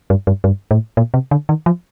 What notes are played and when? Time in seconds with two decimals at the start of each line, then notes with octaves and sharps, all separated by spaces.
0.10 G2
0.27 G2
0.44 G2
0.71 A2
0.97 A#2
1.14 C3
1.31 D3
1.49 D#3
1.66 F3